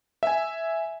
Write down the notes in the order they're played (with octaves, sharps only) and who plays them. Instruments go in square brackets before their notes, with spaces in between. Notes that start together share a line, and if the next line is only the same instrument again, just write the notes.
[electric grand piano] E5 G#5